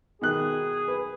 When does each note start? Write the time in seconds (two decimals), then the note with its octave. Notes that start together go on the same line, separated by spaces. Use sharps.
0.21 B2 D#3 G#4 F#6
0.88 B4